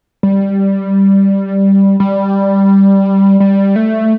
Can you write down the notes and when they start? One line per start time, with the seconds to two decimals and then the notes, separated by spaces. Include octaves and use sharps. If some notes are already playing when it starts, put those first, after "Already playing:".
0.23 G3
2.00 G3
3.40 G3
3.76 A3